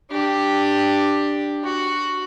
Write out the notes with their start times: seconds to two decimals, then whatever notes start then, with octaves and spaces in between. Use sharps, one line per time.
0.11 D4 G4
1.64 F#4